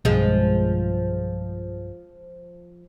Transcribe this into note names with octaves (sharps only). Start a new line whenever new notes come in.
B1 G2 F3 G#3